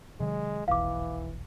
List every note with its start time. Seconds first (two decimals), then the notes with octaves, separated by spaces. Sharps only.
0.20 C3 D#3 F#3 G#3
0.68 F1 B1 E2 E3 F5 D6